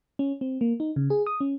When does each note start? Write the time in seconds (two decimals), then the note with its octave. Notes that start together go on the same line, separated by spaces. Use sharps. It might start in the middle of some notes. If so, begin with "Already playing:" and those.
0.19 C#4
0.41 C4
0.61 A#3
0.80 D#4
0.96 C#3
1.10 G#4
1.26 D#6
1.40 C#4